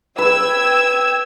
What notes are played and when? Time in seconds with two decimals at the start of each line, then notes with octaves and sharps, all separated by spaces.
0.18 B4 G5 E6 G#6